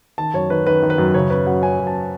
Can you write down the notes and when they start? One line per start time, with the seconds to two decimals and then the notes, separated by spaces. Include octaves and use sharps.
0.18 D#3 A5
0.34 F#2 C#5
0.50 D#3 B4
0.67 D#3 B4
0.83 D#3
0.90 B4
0.98 F#2
1.14 C#3 C#5
1.30 C#4 B4
1.46 F#2 F#5
1.63 C#4 G#5
1.79 F#2
1.87 A5